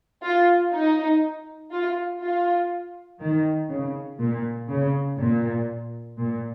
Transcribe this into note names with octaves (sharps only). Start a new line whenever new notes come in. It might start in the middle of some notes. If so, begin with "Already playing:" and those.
F4
D#4
F4
F4
D#3
C#3
A#2
C#3
A#2
A#2